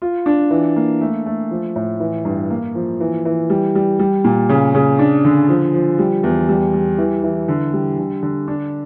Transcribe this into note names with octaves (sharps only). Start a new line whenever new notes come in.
F4
D4
E3
A#3
A3
A3
F3
A2
E3
G2
A#3
F3
E3
E3
G3
G3
G3
A#2
C#3
C#3
D4
D3
F3
F3
G3
E2
G3
G3
E3
E3
D3
G3
D3
D3
D4